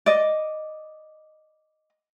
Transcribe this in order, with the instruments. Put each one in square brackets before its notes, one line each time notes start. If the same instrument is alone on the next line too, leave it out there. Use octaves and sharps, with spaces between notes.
[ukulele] D5 D#5